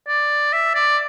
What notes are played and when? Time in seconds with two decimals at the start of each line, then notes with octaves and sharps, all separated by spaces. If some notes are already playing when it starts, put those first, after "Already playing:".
0.07 D5
0.53 E5
0.75 D5